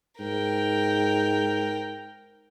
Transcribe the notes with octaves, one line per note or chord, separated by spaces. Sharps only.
G#2 A#4 G5